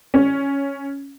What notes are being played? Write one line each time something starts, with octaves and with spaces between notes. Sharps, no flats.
C#4